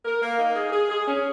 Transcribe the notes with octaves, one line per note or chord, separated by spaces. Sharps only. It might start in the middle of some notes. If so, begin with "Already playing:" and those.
A#4
A#3
D#4
G#4
G#4
G#4
C#4